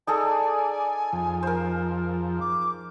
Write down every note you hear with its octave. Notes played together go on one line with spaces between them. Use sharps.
D#4 G#4 A4 D5 G#5
F2 F3
A#4 C5
D6